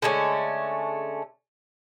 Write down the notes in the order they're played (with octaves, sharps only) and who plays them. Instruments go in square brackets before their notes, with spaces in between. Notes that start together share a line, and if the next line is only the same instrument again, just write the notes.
[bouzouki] D3 G#3 A3 C#4